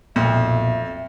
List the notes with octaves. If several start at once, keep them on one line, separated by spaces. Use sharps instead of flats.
B1 F2 A#2 E5